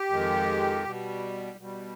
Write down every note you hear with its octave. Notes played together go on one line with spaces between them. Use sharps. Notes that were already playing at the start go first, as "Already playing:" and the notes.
Already playing: G4
F2 D#3 G#3
B2 G3
B2 G3